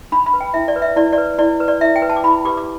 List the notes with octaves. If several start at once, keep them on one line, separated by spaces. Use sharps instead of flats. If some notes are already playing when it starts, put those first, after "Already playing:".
D4 B5
B5
B4
G5
E4 E5
D5
B4
E5
E4 D5
D5
B4
E4 D5
B4
D5
E4 E5
G5
B4
A5
D6
E4 B5
G4 B4 D6
D6